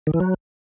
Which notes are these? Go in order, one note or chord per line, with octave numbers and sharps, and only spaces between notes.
D#3
E3
F#3